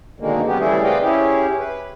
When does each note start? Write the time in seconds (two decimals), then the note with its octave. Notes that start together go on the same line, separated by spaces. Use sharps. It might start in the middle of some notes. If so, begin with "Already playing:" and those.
0.20 B2 D3 D#3 G#3 A#3
0.46 F#3 B3 C#4 G4
0.58 C#3 E3 G3 A3 E4 G#4
0.83 C4 B4 D5 D#5 F5 G5
1.01 C#4 E4 G4 G#4
1.58 B4